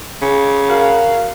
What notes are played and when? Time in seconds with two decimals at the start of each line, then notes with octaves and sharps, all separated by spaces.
0.22 C#3
0.68 F#4 A#4 F5